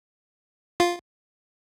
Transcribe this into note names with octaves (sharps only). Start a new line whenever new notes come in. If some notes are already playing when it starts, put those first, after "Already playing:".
F4